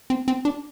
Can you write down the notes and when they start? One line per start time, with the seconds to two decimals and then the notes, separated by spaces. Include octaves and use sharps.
0.10 C4
0.28 C4
0.45 D4